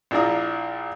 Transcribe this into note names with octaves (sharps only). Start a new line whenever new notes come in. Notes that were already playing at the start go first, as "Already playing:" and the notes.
A#1 D4 E4 F4 A#5 D#6